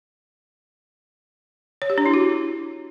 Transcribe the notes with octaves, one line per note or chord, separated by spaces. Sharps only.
C#5
G4
D4
E4
F#4